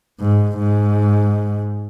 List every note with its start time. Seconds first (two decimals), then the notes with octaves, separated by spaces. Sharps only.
0.20 G#2
0.58 G#2